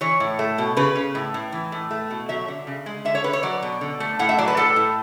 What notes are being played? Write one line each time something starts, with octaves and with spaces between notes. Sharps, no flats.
E3 C#5
A2
A3
B2
C#3 B4
C#3
A2
A2
E3
A2
A3
B2
F#3 E5
D3
C#3
G#3
D3 E5
C#5
D3 B4
C#5
F#3 D5
B2
D3
A3
A2 F#5
E5
F#3 D5
B4
A2 A4
A2